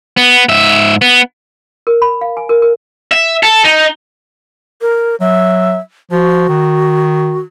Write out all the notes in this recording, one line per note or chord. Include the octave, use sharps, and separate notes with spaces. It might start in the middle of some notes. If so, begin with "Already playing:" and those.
B3
G#2 E5
B3
A#4
B5
F5
G#5
A#4
A#4
E5
A4
D#4
A#4
F#3 E5
F3 F#4
D#3